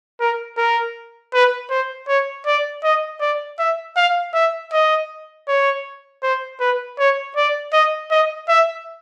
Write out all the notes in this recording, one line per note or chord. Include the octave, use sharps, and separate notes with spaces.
A#4
A#4
B4
C5
C#5
D5
D#5
D5
E5
F5
E5
D#5
C#5
C5
B4
C#5
D5
D#5
D#5
E5